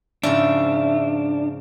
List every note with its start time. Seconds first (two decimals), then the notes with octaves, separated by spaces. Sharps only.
0.24 G#2 C#3 F3 D4 E5